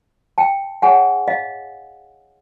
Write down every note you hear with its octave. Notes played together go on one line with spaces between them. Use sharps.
G5 A5
D#4 G#4 C#5 F#5 G#5
D#5 F5